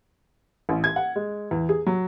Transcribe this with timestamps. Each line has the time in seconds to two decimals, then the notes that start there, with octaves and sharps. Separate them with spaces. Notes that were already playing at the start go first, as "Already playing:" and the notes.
0.69 A1
0.84 G#6
0.96 F#5
1.16 G#3
1.51 E2
1.69 G#4
1.87 F#3